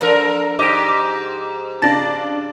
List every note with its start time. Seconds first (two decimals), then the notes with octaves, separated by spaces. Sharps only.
0.01 F3 A#3 D4 F4 A4 A#4
0.59 G#2 G4 D#5 D6 D7
0.89 D6
1.82 C#3 D4 A5 A6 A#6